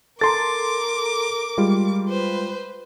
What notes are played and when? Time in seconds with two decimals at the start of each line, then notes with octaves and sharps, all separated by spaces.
0.21 A4 A#4 A#5 C6 D6 A6
1.58 G3 G#3 F4
2.09 B4 C5